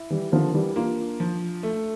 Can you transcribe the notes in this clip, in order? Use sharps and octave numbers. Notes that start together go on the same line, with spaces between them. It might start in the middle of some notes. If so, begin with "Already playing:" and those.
Already playing: E4
E3 G3
D3 F3 A#4
E3 G3
A#3 D4 F4
F3
A3